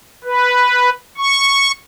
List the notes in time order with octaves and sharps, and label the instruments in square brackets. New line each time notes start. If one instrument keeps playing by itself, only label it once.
[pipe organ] B4
C#6